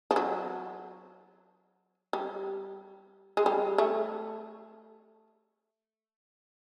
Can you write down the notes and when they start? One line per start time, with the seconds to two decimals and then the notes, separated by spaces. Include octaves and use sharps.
0.11 F3
0.16 F#3
2.13 G3
3.37 G#3
3.46 G3
3.78 A3